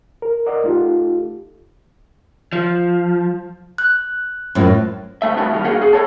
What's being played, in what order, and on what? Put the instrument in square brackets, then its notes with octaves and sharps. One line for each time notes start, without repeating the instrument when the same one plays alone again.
[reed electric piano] A#4
A#4 D5 D#5 F#5
A3 D#4 F4 G4 A4
[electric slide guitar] F3
[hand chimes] F#6
[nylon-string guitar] F#2 A2 F3
[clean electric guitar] D2 A3 E5
G2 B3 F#4 E5 A5
A#2 D#3 G3
A#3 D4 F#4 G#4 A4 F#5
C2 F#2 G#4
A4 B4 C#5 A5